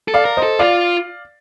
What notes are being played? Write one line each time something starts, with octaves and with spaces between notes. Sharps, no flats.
A4
D5 F5
A#4
C5 D#5
A4
F4 D5 F5